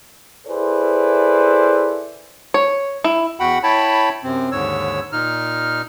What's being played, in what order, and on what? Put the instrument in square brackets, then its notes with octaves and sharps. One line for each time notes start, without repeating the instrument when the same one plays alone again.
[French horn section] E4 G#4 A4 B4 C5 D5
[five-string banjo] C#5
E4
[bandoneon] E2 F#4 F#5 G5 B5
E4 C#5 G5 A5 B5
F#2 C3 C4
D#2 G#2 D3 C#5 E6
A#2 D#4 F6